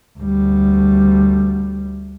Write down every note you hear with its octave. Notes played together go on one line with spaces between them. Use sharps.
D2 G3